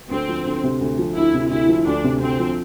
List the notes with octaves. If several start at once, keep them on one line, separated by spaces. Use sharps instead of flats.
D2 C4
F3
D2
C3
D2
F3
D2 E4
C3
D2 E4
F3
D2 D4
C3
D2 C4
F3